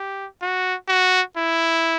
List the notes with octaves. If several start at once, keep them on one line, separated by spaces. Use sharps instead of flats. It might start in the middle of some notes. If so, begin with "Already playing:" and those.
Already playing: G4
F#4
F#4
E4